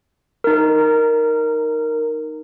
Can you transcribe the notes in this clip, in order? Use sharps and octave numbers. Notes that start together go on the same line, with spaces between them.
D#4 A#4